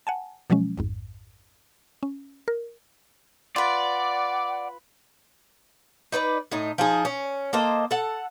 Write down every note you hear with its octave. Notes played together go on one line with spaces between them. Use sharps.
F#5 G#5 A5
B2 F3 F#3 G#3 C#4
A1 F2 G#2
C#4
A#4
F4 B4 D5 F#5
D#4 B4 C5 D5
A2 D#4
F3 D#4 G#4
C#4
A#3 A4 C5 D#5
A4 F#5